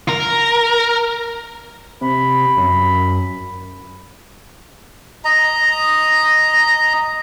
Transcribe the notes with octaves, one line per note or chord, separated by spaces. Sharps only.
A#4
C3 B5
F#2
D#5 A#5